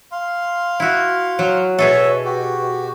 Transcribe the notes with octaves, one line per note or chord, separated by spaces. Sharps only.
F5 C6
E4 F#4
F#3
B2 G#4 A4 C#5 E5
F#4 G4